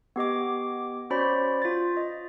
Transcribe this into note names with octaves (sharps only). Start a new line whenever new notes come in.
B3 G4 D#5 D6
C#4 F#4 C5 D5 B5 C#6
F4 A6
D#5